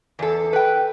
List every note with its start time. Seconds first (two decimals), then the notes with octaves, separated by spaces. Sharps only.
0.19 E2 A4
0.53 B4 G5